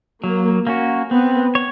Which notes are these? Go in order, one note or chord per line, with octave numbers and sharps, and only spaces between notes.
F#3 A#3
A#3 C#4 F#4
B3 C4
C#5